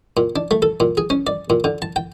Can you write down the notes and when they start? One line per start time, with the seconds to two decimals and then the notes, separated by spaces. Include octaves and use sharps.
0.17 A#2
0.36 D4
0.51 A3
0.62 A4
0.80 A#2
0.97 G#4
1.10 C#4
1.27 D5
1.50 A#2
1.64 D3
1.82 A5
1.96 G5